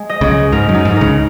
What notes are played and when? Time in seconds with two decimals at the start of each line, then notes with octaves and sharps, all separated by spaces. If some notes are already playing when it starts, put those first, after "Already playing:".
Already playing: G#3
0.09 D#5
0.21 C#2 C#3
0.31 G#3
0.52 G#2 A#4
0.69 F#2
0.74 D#4
0.85 G#2
0.96 A#4
1.01 C#2 C#3